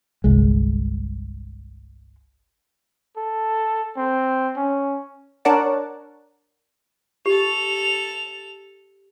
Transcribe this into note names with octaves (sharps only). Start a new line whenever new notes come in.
G1 C2 G#3
A4
C4
C#4
D4 A#4 C#5 D5 F#5 A5
G4 A4 F7